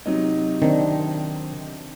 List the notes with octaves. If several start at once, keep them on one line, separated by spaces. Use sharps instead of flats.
C3 F#3 D#4
D#3 C4 D4